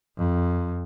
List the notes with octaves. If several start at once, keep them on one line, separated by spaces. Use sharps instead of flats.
F2